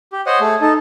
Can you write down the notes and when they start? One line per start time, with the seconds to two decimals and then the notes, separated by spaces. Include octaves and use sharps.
0.13 G4
0.26 C5 C#5 D#5 F#5
0.41 A3 G#4
0.61 D#4 A4